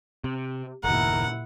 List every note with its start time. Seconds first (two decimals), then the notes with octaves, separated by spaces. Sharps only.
0.24 C3
0.84 F#1 D#2 A#2 E4 A#4 F#5